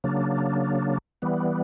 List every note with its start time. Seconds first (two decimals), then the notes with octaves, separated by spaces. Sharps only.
0.04 C#3 F#3 A#3 D4
1.22 E3 G3 B3